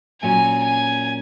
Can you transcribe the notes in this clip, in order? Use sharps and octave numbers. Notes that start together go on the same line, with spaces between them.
A#2 F#3 C#4 G#5
G#5